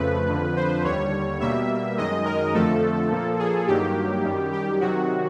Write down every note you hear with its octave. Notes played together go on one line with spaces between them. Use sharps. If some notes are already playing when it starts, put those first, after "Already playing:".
Already playing: F2 C#3 F3 A3 B4
F2 D3 F3
C5
D#2 D3 G3 C#5
B2 G3 A#3 E5
F#2 D#3 G#3 D#5
A#4
F2 D3 F3 A3 A4
A#2 F3 A#3
G#4
G2 D#3 F#3 A#3 G4
F#2 D#3 G3
G4
C3 D#3 F#3 F#4